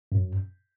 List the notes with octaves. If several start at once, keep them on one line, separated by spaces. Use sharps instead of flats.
F#2